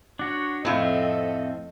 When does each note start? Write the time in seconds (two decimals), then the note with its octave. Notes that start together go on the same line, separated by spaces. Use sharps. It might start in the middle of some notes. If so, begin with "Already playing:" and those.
0.19 D4 F#4 C#5
0.65 F2 A2 C4 F4 A4 D#5 E5